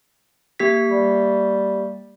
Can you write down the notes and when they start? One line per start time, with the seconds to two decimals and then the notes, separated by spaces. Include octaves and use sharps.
0.60 A#3 G4 B6
0.89 G3